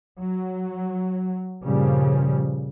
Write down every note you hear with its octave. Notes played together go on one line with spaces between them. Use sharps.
F#3
G2 A#2 C#3 F3 G3